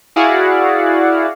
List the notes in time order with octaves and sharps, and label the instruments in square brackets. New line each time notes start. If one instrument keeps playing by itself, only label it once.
[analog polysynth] E4 F#4 G#4 D5 F5 F#5